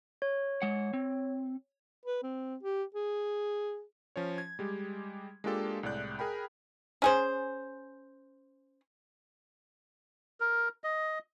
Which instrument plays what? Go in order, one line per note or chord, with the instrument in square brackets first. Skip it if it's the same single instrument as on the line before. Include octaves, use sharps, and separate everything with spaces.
[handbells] C#5
[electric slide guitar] G#3 F#5
C4
[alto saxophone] B4
C4
G4
G#4
[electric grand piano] F3 C#4 C#5
G#6
G3 G#3 G4
G#3 A#3 D4 F4 G4 A4
C2 A2 G#3 D5 F#6 G6
G#4 A#4 G5 B5
[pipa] C#4 G#4 C5
[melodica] A#4
D#5